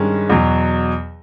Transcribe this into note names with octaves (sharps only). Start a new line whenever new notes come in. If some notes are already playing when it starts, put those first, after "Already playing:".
Already playing: G2 D#3 G#3 C#4
E2 B2 F#3